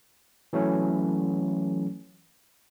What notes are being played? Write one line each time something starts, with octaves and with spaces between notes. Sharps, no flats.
E3 F#3 A3 C#4